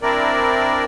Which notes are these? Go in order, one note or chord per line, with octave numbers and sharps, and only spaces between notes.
C4 D4 E4 A#4 D5